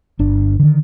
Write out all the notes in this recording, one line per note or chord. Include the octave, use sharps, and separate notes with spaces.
G1 D4
D3 D#3